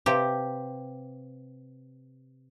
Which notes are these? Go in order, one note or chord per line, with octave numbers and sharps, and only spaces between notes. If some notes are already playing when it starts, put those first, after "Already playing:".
C3 G4 B4 F5 G5